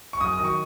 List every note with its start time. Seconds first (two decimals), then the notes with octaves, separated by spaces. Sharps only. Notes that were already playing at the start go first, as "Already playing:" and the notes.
0.13 C#6
0.21 F#2 D#6
0.33 D#6
0.39 D#3 F#3
0.45 C#6